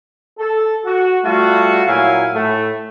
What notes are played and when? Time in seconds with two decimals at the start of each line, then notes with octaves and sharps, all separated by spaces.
0.38 A4
0.85 F#4
1.24 G3 A3 F4 F#4
1.87 A#2 F#3 E4 F5 G#5
2.34 A2 A3